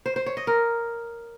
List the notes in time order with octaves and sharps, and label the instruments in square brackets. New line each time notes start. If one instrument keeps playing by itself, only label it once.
[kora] C5
C5
C#5
D#5
A#4